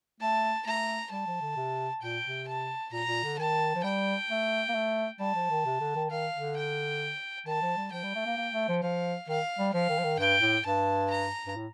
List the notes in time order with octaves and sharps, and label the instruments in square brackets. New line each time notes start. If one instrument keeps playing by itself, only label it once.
[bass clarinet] A3 [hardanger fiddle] A5
[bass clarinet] A3 [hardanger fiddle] A#5
[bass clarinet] G3 [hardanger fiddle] A5
[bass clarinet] F3
D3
C3
[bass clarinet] A#2 [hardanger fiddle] G5
[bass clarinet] C3
[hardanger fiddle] A5
[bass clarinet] A#2 [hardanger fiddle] A#5
[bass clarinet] A#2
D3
[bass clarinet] D#3 [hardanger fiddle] A5
[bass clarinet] F3
[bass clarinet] G3 [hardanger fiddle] G5
[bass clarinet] A3
A#3
A3
[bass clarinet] G3 [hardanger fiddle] A5
[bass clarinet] F3
D#3
C3
D3
D#3
[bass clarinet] D#3 [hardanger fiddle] F5
[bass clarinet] D3
[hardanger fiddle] G5
[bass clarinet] D#3 [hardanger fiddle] A5
[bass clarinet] F3
G3
[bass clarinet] F3 [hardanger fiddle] G5
[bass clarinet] G3
A3
A#3
A#3
A3
F3
[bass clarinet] F3 [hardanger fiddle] F5
[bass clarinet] D#3 [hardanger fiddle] F5
[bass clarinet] G3
[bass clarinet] F3 [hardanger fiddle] F5
[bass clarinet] D#3
F3
D#3
[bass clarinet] G2 [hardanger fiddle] G5
[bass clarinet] A2
[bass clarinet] G2 [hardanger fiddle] A5
[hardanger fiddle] A#5
[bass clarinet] G2
A2